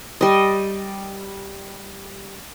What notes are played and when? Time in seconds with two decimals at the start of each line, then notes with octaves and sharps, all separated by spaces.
0.21 G3 D#5